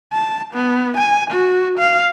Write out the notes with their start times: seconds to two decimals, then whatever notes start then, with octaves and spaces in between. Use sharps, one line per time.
0.13 A5
0.54 B3
0.97 G#5
1.31 F#4
1.78 F5